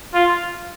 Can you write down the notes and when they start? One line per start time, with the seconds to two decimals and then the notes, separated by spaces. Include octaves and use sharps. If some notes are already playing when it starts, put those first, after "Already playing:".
0.14 F4